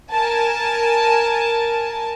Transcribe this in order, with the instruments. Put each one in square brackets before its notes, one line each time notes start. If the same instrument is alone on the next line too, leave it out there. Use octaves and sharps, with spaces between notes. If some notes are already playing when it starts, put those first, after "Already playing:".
[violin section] A#4 G#5 A5